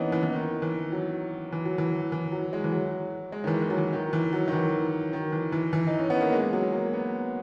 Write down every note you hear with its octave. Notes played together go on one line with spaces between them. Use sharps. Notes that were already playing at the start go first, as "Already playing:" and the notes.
Already playing: E3 A#3 B3 C#4 D#4
E3
E3
D#3
E3
F#3
E3
F#3
E3
E3
F#3
G#3
E3
F#3
G#3
D#3
E3
E3
F#3
E3
D#3
E3
F#3
D#3
E3
D#3
E3
E3
E3
D#4
C#4
B3
A#3
G#3
F#3
A#3
B3